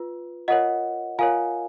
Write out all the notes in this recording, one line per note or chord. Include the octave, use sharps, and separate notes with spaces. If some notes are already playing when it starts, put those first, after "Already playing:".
Already playing: F4 B4
F4 A#4 C#5 D#5 F#5
F4 A#4 C#5 F5 G#5